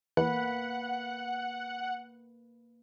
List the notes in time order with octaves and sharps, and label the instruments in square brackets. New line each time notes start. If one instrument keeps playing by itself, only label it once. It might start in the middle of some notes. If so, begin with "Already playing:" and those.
[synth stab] E2 [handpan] A#3 B4 [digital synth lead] F#5